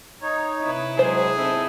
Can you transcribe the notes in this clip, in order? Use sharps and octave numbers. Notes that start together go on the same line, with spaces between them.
D#4 C#5
C3 E4 B4
B2 F#3 G#3 G#4 C5
C4 D#4 E4 A4